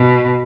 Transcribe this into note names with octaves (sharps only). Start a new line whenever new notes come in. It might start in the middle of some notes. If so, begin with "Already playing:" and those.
Already playing: B2